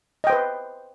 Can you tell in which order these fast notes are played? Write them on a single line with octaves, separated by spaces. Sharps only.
D#5 G5 C5 B4